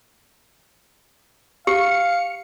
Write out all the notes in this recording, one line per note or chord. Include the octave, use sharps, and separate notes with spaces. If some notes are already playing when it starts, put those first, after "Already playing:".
G4 F5 C#7